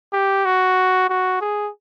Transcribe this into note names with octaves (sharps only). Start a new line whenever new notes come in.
G4
F#4
F#4
G#4